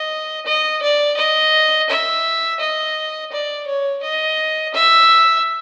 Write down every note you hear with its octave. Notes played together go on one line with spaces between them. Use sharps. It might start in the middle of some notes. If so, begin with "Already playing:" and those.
Already playing: D#5
D#5
D5
D#5
E5
D#5
D5
C#5
D#5
E5